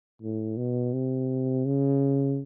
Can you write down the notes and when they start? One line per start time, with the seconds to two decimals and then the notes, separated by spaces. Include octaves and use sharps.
0.22 A2
0.57 B2
0.93 C3
1.65 C#3